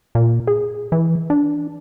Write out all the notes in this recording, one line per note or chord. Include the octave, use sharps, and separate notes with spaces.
A#2
G#4
E3
D4